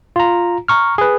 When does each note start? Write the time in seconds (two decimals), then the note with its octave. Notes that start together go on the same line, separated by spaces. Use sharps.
0.16 F4 A#5
0.68 A#5 C#6 F6
0.98 G#4 B4